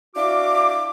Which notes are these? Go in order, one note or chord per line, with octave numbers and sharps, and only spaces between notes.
D4 E4 F#4 F5 D6